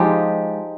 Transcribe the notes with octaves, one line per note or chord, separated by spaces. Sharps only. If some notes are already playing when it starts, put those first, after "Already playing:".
Already playing: F3 G#3 D#4 G4